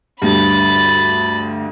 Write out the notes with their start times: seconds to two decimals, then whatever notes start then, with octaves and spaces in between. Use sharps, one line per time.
0.22 D2 G2 B5 A6